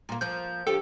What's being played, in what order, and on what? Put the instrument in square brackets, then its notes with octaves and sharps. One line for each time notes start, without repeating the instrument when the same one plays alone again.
[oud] A#2 A#3
[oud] F3 A#3 [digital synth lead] G6
[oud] D2 F3 G4 [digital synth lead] A4